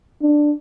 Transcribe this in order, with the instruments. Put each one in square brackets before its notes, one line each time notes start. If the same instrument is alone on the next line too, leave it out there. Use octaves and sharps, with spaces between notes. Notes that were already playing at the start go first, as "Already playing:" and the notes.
[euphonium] D4